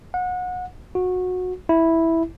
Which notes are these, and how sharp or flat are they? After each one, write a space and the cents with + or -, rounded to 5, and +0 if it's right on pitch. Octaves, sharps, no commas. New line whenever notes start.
F#5 -30
F#4 -20
E4 -5